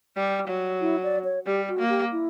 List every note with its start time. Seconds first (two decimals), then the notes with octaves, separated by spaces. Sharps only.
0.16 G3
0.48 F#3
0.81 E4
1.03 D5
1.24 C#5
1.46 G3 G4
1.69 F#4
1.79 A#3
1.89 G4
2.12 E4